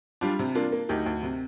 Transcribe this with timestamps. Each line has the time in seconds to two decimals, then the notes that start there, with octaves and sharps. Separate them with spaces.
0.21 G3 D4 F4
0.39 C3
0.55 A#3 D4 F4
0.72 A#3
0.89 D2 D#4 G4
1.06 D2
1.23 C3